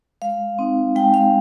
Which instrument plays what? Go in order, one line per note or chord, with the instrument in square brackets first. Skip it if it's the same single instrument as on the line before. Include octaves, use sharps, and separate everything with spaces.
[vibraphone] G#3 F5
C4 D#4
G#3 G5
F5